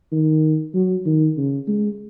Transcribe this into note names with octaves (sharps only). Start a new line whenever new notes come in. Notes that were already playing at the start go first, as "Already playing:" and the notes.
D#3
F#3
D#3
C#3
G#3